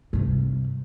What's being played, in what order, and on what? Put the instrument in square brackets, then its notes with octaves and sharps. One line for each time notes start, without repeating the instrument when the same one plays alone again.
[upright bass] G2 C3